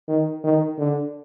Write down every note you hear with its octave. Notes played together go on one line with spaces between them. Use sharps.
D#3
D#3
D3